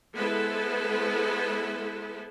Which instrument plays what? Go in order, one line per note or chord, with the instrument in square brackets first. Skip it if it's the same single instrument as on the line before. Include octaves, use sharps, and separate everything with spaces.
[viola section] G#3 B3 E4 A4 B4 C5